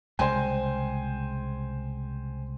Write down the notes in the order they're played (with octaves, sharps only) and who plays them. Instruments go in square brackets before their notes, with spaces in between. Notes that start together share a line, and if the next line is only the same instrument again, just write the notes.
[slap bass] C2 C#3 G#3 [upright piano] C5 G5 G#5